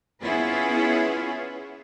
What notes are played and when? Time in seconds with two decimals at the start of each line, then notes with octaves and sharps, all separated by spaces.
0.22 B3 C#4 E4 F4 G#4 B4